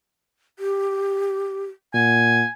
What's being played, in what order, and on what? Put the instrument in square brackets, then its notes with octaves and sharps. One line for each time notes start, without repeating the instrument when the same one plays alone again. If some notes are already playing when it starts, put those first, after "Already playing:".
[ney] G4
[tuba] A#2 [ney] F#5 [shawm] G#5